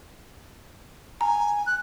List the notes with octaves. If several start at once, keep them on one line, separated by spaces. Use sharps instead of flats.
G#5 A#5
F#6